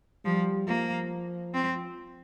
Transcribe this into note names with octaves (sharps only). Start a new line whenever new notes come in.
F3 G3
F3 A#3
C4